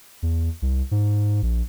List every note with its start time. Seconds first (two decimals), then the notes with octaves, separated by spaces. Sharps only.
0.22 E2
0.62 C2
0.91 G#2
1.43 A#1